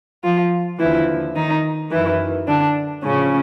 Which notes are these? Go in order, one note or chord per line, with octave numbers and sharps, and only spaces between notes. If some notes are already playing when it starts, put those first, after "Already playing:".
F3 F4
D#2 D3 E3 F3 E4
D#3 D#4
F#2 D#3 E3 E4
D3 D4
A2 C#3 F3 C#4